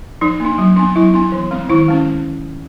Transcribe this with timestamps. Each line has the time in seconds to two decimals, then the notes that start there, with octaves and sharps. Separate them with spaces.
0.21 F3 D#4
0.40 A#3 D4
0.58 F#3
0.76 B3 D4
0.95 F#3 E4
1.14 B3 D4
1.32 E3
1.51 G#3 C4
1.69 D#3 E4
1.88 G#3 C#4